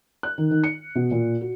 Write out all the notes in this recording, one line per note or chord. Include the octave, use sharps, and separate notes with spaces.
F#6
D#3
D#3
C#7
B2
A#2
F#4